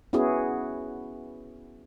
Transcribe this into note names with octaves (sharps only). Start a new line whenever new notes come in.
B3 C#4 E4 F#4 G#4